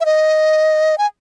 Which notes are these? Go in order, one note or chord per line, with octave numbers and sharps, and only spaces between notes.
E5
D#5
G#5